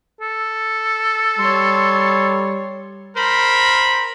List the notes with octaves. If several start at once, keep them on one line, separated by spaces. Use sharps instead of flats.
A4
G3 C#5 C6
A#4 C5 B5